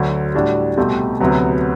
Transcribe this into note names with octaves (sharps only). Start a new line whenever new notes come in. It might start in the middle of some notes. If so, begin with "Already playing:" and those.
Already playing: D2 D3 F#3
A2 G3 D4 F#4
C2 B2 A3 C4 G4
D2 C3 F#3 B3